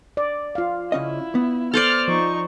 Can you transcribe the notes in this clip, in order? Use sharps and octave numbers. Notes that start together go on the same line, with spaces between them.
D5
F4 F5
C#3 C#4 E4 D#5
B3
A4 C5 D5 F6
F3 D#4 C#6